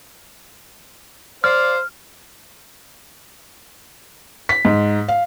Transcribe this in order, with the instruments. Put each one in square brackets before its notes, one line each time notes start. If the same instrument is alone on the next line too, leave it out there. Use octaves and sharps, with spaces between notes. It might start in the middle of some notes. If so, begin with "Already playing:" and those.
[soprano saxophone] C5 [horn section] D5 F5 [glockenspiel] F6
[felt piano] B6
G#2
F5